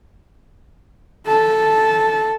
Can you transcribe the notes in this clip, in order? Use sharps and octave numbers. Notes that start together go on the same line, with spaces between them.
A4 A5